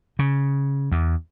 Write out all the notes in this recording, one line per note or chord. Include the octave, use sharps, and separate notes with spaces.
C#3
E2